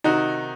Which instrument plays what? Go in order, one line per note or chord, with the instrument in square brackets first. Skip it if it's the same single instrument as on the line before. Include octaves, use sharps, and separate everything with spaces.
[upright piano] C3 D#3 D#4 F#4